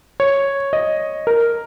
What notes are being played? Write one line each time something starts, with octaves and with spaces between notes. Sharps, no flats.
C#5
D#5
A#4